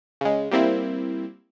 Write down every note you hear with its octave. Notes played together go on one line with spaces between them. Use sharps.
C#3 G#3
G3 A#3 C4 E4